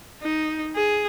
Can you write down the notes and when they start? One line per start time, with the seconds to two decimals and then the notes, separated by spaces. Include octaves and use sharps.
0.22 D#4
0.76 G#4